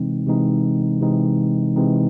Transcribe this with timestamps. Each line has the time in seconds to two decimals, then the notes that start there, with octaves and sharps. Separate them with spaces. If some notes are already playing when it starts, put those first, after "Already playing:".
Already playing: C3 E3 G#3 C4 D#4
0.27 C3 E3 G#3 C4 D#4
1.01 C3 E3 G#3 C4 D#4
1.76 C3 E3 G#3 C4 D#4